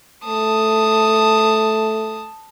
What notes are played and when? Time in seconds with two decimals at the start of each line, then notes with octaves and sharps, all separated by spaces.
0.25 A3 A5 D#6